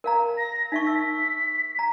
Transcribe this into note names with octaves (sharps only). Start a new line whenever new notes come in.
A#4 F5 A#5
A#6
D#4 E5 C#6 B6
E6 B6
A#5